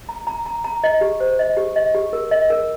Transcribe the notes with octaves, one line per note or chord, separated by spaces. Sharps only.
A#5
A#5
A#5
A#5
D#5
G4
C5
D#5
G4
D#5
G4
A#4
D#5
A#4